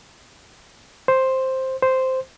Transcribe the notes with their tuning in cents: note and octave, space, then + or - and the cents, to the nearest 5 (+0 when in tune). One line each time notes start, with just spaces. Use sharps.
C5 +5
C5 -5